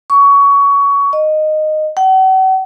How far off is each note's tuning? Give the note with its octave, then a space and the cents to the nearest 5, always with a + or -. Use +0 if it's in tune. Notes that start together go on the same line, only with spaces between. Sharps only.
C#6 +20
D#5 -10
F#5 +40